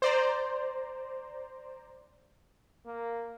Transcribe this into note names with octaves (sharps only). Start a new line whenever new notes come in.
C5 D5 A#5
A#3